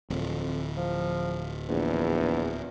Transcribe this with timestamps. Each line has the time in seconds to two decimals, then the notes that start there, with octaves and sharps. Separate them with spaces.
0.10 D1 F2
0.77 F3
1.69 A#1 E2